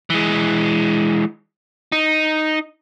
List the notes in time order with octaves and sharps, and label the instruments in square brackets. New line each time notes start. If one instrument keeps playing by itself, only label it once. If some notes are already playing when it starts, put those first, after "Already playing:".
[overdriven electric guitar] E3 G#3
D#4